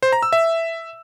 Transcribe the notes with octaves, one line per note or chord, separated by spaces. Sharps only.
C5
A#5
E6
E5